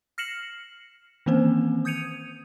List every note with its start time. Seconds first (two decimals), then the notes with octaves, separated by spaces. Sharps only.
0.18 F6 A#6 C7 C#7 E7 F#7
1.26 D#3 E3 A#3 C4 C#4 C5
1.85 D#6 G6 G#6 C#7 D#7 F7